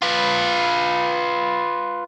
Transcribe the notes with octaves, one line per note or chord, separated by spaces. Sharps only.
F4 B4